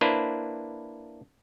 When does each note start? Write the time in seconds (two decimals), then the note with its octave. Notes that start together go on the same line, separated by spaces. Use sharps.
0.01 A#3 D4 E4 B4 C5